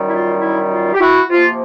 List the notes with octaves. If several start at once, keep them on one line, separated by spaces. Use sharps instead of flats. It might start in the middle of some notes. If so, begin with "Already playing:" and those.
Already playing: F#2 D#3 G3
E4
F4
E4
F4
G4
E4 F#4
C3 F3 A#3 F4